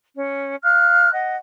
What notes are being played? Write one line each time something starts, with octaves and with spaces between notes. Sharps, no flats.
C#4
F5 F6 F#6
D#5 F#5